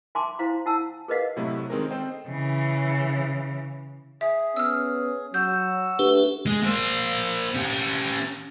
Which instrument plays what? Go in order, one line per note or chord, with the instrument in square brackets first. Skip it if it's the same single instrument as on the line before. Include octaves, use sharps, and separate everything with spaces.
[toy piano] E5 G#5 A5 C6 D6
E4 C5 F5 A#5 C6
E4 F#5 G#5 A5 E6
G#4 A#4 B4 D#5 F5 F#5
[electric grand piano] A2 C3 F#3 A3 E4
D#3 G#3 C4 C#4 A#4
C4 A4 C5 D#5 G5
[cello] C#3 E3
[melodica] G#4 [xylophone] E5
[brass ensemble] B3 C#4 [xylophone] E6 F6
[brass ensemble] F#3 [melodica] F#4 E6 [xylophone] G6
[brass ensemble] A3 [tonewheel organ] D4 G4 B4
[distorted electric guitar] G#3
A#3 C5
C#4 G4